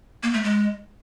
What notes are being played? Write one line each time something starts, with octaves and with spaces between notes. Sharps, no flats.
A#3
A3
G#3